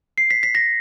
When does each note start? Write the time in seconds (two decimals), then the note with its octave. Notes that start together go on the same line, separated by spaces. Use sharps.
0.18 C7
0.31 B6
0.43 B6
0.55 A#6